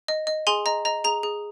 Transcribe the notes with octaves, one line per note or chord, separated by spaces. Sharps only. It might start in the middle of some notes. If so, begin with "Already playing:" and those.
D#5
D#5
G#4 G#5 C6
D#5 A#5
D#5 A#5
G#4 A#5
G#4